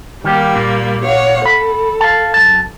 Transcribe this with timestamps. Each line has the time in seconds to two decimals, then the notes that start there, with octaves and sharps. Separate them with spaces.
0.24 D#3 G3 A#3 G4
0.55 A#2
1.04 C#5 F5 F#5
1.46 A4 B5
2.01 F5 A5
2.34 F#2 A5